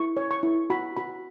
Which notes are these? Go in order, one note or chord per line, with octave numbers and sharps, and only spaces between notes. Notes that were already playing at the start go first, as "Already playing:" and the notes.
Already playing: E4 C#6
C#5
C#6
E4
F#4 B5
F#4 B5